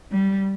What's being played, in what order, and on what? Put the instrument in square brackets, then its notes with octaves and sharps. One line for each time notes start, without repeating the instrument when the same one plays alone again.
[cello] G3